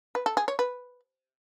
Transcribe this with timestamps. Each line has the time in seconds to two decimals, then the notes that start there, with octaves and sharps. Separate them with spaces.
0.15 B4
0.26 A4
0.37 G#4
0.48 C#5
0.59 B4